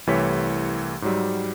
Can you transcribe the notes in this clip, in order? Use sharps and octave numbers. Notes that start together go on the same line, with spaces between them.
C2 E3 A3 G4 C#5 B6
G#2 F#3 G3